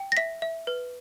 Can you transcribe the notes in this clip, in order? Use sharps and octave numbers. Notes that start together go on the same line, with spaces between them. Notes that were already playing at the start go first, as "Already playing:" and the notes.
Already playing: G5
A#6
E5 B6
E5
B4